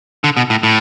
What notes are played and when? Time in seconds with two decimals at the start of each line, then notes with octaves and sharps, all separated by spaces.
0.24 D3
0.37 B2
0.50 A2
0.63 A2